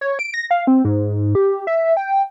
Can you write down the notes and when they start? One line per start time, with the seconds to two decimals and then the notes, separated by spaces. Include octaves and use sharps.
0.01 C#5
0.19 D7
0.34 A#6
0.51 F5
0.67 C4
0.85 G#2
1.35 G4
1.67 E5
1.97 G5